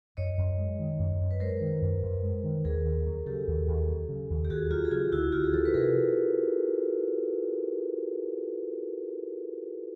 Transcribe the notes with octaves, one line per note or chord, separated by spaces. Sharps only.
F#2 C#5 D#5
F#2
G#3
D#3
F#2
F#2
B4
G#3 A#4 C5
D#3
F#2
F#2
G#3
D#3
D#2 G#4 A#4
D#2
F#3
C#3 G4 A4
D#2
D#2
F#3
C#3
D#2
G4
D#2 F#4 G#4
F#3 F4 G4
G#4
C#3 F4 G4
D2 E4 F#4
D2 F4 G4
G#4
F3 G4 A4
B4
C3 G#4 A#4